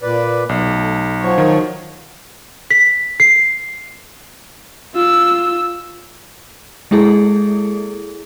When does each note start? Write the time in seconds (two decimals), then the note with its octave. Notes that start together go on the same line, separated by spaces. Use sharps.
0.02 A#2 B4 D5
0.49 B1
0.66 A3
1.21 F3 F#3 C#5
1.38 D#3
2.71 B6
3.20 C7
4.94 F4 E6
6.91 G#3 A#3 E4 G#4 A4